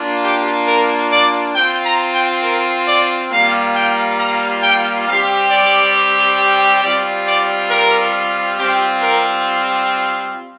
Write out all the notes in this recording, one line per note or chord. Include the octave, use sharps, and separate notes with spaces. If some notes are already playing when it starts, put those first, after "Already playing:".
Already playing: A#3 D4 F4
G4
A#4
D5
C4 F4 G5
A#5
G5
A#4
D5
G3 A#3 F4 F5
G5
A#5
G5
G3 C4 G4 F5
D5
G3 C4 F4 D5
D5
A#4
G3 C4 F4 G4
A#4